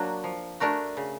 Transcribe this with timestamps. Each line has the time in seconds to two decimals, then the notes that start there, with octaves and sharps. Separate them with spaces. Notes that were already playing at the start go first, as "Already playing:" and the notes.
Already playing: F#3 A#3 D4 F#4
0.24 F3
0.60 A3 D4 F#4 A#4
0.97 C#3